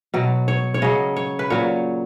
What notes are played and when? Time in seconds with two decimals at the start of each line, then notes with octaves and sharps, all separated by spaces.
0.14 B2 F#3
0.48 C#5
0.74 C#5
0.82 C#3 F#3 D#5
1.16 C#5
1.39 B4
1.50 A#2 F#3 C#5